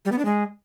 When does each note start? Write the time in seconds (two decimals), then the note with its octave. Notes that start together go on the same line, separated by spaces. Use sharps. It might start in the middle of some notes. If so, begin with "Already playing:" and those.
0.05 G3
0.12 B3
0.19 D4
0.25 G#3